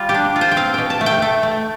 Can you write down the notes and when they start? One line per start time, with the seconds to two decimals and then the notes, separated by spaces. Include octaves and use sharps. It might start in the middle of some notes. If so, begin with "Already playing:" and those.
Already playing: G3 F4
0.09 G4
0.14 D4
0.36 F4
0.41 C5
0.52 G5
0.57 C4 F5
0.74 B2 G5
0.90 A5
1.01 A3
1.06 G5
1.22 A3
1.43 A3